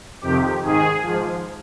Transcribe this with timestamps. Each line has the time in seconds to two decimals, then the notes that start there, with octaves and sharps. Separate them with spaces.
0.21 F2 C3 D#3 G4
0.61 G#2 D#3 G#4
1.02 G#2 F3